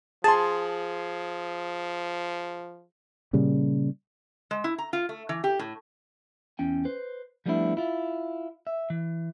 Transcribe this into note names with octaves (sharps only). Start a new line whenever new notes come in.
F3 G#4 A5 C6
A#2 C#3 G3
G#3
E4
A#5
F4
A3
E3
G4
A2
E2 C#4 G5
B4 C5
F3 G3 A3 B3 D4 E4
E4 F4
E5
E3